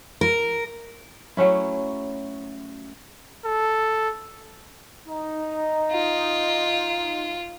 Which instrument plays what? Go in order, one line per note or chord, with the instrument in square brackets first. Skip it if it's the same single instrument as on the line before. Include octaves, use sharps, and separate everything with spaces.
[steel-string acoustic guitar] A#4
[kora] F#3 A3 C#4 E4
[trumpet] A4
[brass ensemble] D#4
[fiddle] F4